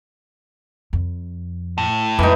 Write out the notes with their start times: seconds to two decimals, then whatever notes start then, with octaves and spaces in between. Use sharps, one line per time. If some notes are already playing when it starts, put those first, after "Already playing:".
0.93 F2
1.78 A2
2.19 F2 E3 G#3 D#4